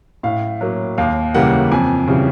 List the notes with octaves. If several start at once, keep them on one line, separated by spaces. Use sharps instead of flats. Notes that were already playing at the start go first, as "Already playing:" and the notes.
A2 F5
F#3 A#3
D#2 F5
C#3 E3 G3 A#3 F#5
F2 G#5
C#3 E3 G3